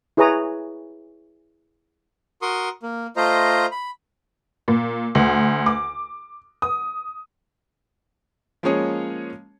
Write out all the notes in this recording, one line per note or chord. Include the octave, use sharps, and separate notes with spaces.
E4 G#4 B4 C#5 A#5 D#6
F#4 A#4 C6 C#6 D#6
A#3
A3 F4 C5 D#5 A#5
B5
A#2
D2
D6
D#6
F3 G#3 A#3 C#4 G#4 C#5